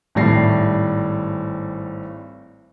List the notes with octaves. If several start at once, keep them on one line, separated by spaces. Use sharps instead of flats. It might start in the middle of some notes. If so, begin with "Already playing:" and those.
G#1 A2 G3 A#6 C7